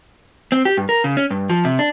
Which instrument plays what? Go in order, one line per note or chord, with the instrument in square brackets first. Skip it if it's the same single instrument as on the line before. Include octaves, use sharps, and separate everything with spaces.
[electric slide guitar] C4
G4
G2
A#4
C#3
C#4
G2
F3
C3
D4